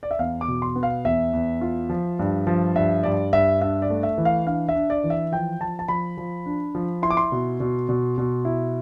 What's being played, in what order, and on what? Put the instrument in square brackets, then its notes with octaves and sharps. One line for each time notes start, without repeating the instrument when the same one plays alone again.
[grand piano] D5
E5
E2 F5
D6
B2
C6
B3
F5
E2 E5
E2
F4
F3
G2
F3
G2 E5
G2 D5
G2 E5
D4 E5
D5
A3
E5
E3
F5
D4 F5
E5
D4
D5
E3
E5
F3 G5
F3 A5
A5
F3 B5
F3
D4
F3
E4 C6
D6
C6
B2
B2
B2
B2
E4